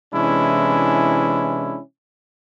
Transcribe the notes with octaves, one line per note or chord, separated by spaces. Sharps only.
C3 E3 G#3 C#4 D4 E4